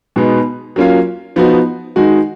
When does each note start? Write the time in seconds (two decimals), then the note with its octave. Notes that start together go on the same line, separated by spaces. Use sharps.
0.16 B2 G#3 B3 D#4
0.76 F#3 A#3 C#4 F4
1.36 F3 B3 D#4 F#4
1.96 D#3 G#3 D#4 F#4